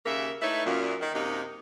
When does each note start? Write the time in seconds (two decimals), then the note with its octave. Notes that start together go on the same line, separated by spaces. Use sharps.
0.06 D#2 C#3 A#3 E5
0.42 A3 D#4 E4 A4 B4 C#5
0.65 F#2 A#2
1.01 D#3
1.14 F#2 C3 A#3 D#4